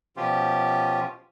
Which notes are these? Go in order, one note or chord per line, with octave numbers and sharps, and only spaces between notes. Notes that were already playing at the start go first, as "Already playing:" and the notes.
B2 F3 C#4 F4 G4